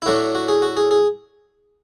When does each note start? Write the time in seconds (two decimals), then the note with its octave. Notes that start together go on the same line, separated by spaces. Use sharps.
0.02 E4
0.06 A2 F#3 A3 D4 F#4
0.35 F#4
0.48 G#4
0.62 F#4
0.77 G#4
0.91 G#4